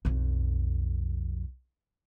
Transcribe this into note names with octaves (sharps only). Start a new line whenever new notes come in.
B1 F2